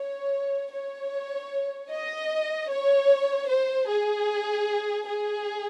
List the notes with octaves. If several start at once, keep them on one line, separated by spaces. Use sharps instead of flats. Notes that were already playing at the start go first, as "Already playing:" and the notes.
Already playing: C#5
C#5
D#5
C#5
C5
G#4
G#4